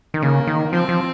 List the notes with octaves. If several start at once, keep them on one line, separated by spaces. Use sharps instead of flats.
D#3
C#3 A#3
D#3
F3 C4
F3